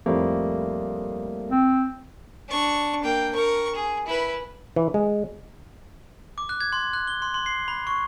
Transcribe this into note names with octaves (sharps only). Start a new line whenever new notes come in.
F2 A2 G3 A3 A#3
C4
D4 C#6
A#3 G5
A#4 C#6
G#4
E4 B4
E3
G#3
D6
F#6
G#6
C6
F#6
G7
C6
C6
C7
B5
C#6